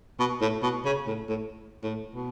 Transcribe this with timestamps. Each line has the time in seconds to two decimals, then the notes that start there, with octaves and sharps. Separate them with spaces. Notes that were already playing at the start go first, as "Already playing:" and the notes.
0.19 B2
0.41 A2
0.62 B2
0.85 C#3
1.07 A2
1.29 A2
1.83 A2
2.15 B2